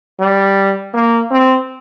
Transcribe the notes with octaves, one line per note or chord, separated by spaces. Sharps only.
G3
A#3
C4